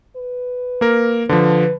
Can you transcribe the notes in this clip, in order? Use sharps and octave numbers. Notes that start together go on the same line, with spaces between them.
B4
A#3 A#4
D3 F3 B4